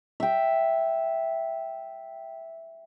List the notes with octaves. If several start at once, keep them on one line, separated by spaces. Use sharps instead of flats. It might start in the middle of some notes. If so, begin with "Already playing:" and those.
E5 G5